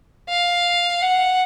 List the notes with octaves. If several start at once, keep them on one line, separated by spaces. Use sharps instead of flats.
F5
F#5